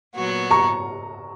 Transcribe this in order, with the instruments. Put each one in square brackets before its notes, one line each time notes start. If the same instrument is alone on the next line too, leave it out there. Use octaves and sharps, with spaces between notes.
[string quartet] A#2 F#3 B3 F#4
[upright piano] A#5 C#6